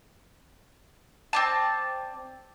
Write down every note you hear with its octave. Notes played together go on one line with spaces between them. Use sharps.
C4 D5 A5